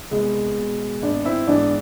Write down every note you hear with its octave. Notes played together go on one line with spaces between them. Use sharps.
C2 G#3 B3
B2
G#1 B3 D4
C4 E4
G#2 E3 B3 D4